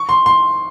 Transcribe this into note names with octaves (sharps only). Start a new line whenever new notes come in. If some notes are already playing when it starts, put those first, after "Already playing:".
Already playing: C#6
C6
C6